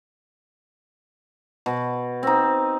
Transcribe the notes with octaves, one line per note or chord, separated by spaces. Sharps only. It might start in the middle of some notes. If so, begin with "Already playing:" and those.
B2
C4 D#4